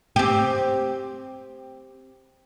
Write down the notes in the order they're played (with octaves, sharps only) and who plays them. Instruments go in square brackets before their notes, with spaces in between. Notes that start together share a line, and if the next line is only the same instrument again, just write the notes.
[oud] C4 G4